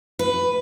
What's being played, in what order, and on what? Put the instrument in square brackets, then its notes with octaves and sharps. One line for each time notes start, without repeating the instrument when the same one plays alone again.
[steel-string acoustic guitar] B4